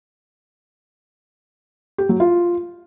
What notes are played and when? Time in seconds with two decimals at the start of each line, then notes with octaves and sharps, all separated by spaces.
1.98 G4
2.09 F#3
2.20 F4